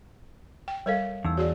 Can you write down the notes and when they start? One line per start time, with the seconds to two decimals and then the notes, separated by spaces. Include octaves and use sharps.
0.68 G5
0.86 G3 A4 A#4 C#5 D#5 F5
1.24 E2 D#4 E6
1.37 F#4 G#4 C#5 D5